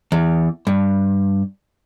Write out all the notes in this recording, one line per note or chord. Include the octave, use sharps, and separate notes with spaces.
E2
G2